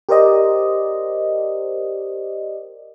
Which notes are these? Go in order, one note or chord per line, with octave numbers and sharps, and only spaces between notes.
G4 A#4 C5 D5 D#5